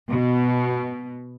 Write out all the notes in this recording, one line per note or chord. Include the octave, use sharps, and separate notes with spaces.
B2